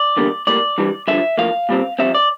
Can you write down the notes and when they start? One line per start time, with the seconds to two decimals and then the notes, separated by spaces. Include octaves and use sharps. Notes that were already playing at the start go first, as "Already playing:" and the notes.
Already playing: D5
0.17 E2 D3 G3 A#3
0.47 A2 G3 A#3 D5
0.78 G2 E3 G3
1.08 G2 D3 F3 E5
1.38 A2 F3 A#3 F5
1.69 A#2 G3 C4
1.99 F2 C3 G3 C4 E5
2.15 D5